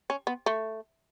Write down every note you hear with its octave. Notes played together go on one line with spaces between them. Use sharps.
C#4
B3
A3